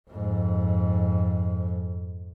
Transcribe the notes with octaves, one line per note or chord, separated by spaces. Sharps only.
F2 G#2